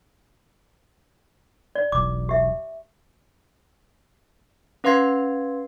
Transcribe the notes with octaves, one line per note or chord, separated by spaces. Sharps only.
D5
E1 B1 D6
G4 E5
C#4 B4 F5 C6 G#6 C7